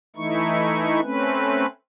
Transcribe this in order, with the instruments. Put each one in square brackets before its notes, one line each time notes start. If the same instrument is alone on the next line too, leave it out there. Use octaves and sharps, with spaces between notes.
[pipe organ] E3 A3 D#4 E4 C#6
A3 C4 C#4 B4